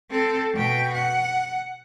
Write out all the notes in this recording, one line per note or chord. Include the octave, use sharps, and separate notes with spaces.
C4 A4
B2 G5
F#5